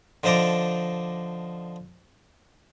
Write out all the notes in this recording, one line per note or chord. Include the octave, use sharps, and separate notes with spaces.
D3 F3 D#4 A5 A#5 D6